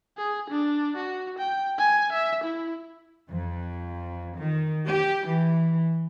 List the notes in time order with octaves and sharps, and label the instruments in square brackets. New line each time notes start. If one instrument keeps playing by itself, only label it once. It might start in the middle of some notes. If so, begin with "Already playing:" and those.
[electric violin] G#4
D4
F#4
G5
G#5
E5
E4
[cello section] F2
D#3
G4
E3